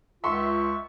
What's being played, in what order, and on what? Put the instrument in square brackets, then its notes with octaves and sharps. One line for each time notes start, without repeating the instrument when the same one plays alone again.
[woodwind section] C#2 F4 C#6 [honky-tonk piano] E5 C6